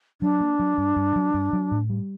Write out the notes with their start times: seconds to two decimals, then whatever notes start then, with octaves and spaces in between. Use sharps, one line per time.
0.21 F#3 D4
0.40 A#3
0.59 F#3
0.78 G2
0.96 G2
1.16 F#3
1.34 G2
1.53 F#3
1.71 A2
1.90 G3